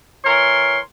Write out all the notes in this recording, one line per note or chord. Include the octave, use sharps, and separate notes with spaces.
E3 A#4 C#5 C6